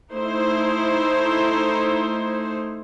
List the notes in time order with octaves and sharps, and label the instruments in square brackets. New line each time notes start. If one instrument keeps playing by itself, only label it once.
[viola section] A3 D#4 E4 C5